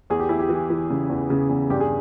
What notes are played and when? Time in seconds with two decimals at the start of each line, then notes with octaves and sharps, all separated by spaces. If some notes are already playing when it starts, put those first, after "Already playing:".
0.10 E2 G#4
0.19 G4
0.29 E2 E4
0.39 G4
0.49 E3
0.70 E3
0.90 C#3
1.10 E2
1.30 C#3
1.49 E2
1.70 G2 G4
1.80 G#4